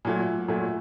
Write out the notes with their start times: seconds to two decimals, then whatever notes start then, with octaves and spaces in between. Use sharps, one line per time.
0.05 A#2 F#3 A3
0.48 A#2 F#3 A3